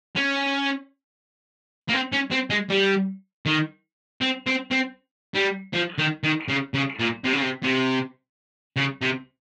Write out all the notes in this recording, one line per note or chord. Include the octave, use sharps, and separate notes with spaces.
C#4
A#3
C4
C#4
C4
G#3
G3
D#3
C4
C4
C4
G3
F3
D#3
D#3
C#3
C#3
A#2
C3
C#3
C3
C3
C#3
C3